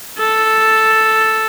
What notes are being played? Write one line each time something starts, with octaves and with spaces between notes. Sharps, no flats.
A4